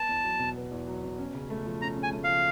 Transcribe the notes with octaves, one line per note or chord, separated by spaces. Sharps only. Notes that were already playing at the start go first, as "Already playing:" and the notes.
Already playing: B3 A5
E2
F#3
B2
B3
E2
F#3
B2
C#4
C#3
A3
F3
C#4 A#5
C#3
G#5
A3
F3 F5